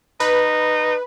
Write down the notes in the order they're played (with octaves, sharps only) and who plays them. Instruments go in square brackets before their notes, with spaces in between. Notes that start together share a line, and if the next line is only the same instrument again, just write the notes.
[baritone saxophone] D#4 [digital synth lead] B4